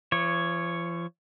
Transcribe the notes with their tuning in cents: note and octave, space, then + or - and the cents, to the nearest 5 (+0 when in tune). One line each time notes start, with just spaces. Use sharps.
F3 -40 C#5 +0